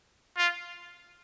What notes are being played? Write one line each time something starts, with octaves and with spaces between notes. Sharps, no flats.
F4